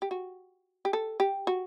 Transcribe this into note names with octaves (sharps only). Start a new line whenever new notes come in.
G4
F#4
G4
A4
G4
F#4